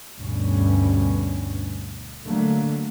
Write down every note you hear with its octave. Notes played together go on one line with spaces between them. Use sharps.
D2 G2 B2 C#4
D3 F#3 A3 A#3